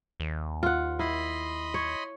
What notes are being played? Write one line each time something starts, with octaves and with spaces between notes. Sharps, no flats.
D#2
F4 F#5
E4 D#5 B5 C6
C#5